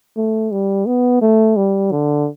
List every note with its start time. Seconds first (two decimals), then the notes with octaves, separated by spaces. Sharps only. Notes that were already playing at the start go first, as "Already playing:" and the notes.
0.17 A3
0.52 G3
0.86 B3
1.22 A3
1.57 G3
1.92 D3